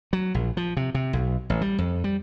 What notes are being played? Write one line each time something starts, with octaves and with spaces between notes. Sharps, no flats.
F#3
A#1
F3
C3
C3
B1
A1
G3
F2
G3